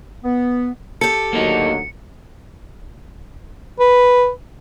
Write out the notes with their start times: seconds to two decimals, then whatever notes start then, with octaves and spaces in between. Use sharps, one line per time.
0.23 B3
1.01 G4 A4 C#7
1.33 D2 F#3 A#3 D#4
3.79 B4